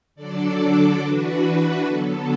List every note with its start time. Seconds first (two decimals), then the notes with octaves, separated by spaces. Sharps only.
0.15 D3 F#3 D4 A4 D5
0.58 A4
1.00 E3 D4 F#4 B4
1.43 F#4
1.85 D3 F#3 B3 A4